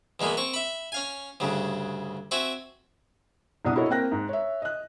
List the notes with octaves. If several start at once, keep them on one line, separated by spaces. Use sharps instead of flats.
E2 B2 G#3 A#3 B3
C4 C#6
E5 B5
C#4 F5 G#5
D2 G2 C#3
C4 F#4 E5 G#5
C2 B2 D4 F#5 D#6
E4 F#4 A4 C#5 D#5 E5
A#3 C4 G5 F#6 A#6
G#2
C#5 E5
D#5 F#6